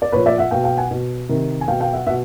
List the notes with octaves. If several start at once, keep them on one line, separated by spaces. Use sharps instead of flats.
D5
A#2 F3 B4 C#5
D5 E5
E5 F#5
B2 F5 G5
F5 G5
F#5 G#5
B2
C3 D#3
G#5
B2 F5 G5
F5 G5
E5 F#5
B2 E5 F#5